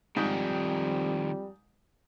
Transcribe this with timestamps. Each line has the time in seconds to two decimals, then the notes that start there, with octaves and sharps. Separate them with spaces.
0.17 F2 G#2 D#3 F3 G3